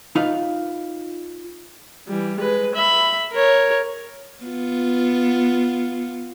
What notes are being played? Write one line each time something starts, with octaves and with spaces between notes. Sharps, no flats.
D#4 F4 B4 F5
E3 G3
G#3 B4
E5 B5
A#4 C#5
B3 F4